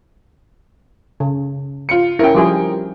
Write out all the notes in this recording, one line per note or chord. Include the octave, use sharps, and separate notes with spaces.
C#3
F4 C#7
C#4 E4 A#4 G5
F3 G3 G#4